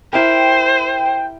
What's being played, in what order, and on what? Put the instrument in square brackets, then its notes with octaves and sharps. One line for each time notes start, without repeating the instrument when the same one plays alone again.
[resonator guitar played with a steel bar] E4 G4 A#4 [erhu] C5 [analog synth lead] G5